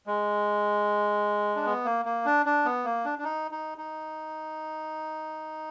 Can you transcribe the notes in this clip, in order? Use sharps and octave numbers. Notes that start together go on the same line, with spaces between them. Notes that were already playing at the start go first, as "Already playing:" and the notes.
G#3
D4
B3
A#3
A#3
D4
D4
B3
A#3
D4
D4
D#4
D#4
D#4